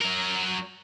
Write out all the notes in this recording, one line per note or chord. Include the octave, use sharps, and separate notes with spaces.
F#3 A#4